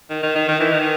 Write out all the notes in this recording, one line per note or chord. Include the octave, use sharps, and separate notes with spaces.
D#3
D#3
D#3
D#3
E3
D#3